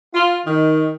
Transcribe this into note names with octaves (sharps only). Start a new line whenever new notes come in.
F4
D#3